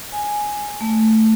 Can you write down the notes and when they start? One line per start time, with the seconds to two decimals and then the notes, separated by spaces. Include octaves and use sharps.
0.12 G#5
0.81 A3